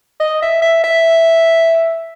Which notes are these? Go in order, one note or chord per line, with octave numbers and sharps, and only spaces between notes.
D#5
E5
E5
E5